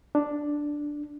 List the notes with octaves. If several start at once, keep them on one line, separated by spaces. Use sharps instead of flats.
D4